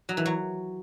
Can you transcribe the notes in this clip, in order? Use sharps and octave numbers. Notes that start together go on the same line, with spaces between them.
F#3
E3
F#3